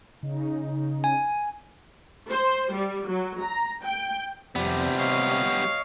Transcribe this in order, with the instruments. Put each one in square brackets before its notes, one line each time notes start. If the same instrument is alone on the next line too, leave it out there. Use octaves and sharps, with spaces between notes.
[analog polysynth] C#3 D#4
[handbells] G#5
[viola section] C5
G3
F#3
A#5
G5
[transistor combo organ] F2 D5 [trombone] C3 [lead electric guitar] G3 B3
[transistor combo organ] C#5 D#5 C#6 [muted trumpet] F5